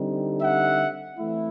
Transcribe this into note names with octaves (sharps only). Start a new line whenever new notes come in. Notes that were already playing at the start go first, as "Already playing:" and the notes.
Already playing: D3 G3 C4 D#4
E5 F#5
E3 A3 C4 E4